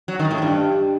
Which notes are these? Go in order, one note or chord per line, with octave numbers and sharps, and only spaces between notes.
F#3
D#3
A2
G2